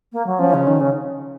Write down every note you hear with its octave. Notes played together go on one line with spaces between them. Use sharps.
A#3
F#3
F3 C#4
C#3
D#3
C#3